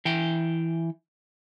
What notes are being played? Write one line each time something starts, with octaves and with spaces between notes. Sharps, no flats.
E3 G5